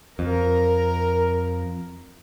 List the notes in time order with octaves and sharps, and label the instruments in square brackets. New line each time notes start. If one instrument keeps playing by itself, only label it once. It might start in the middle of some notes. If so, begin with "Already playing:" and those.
[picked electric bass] F2 [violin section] A#4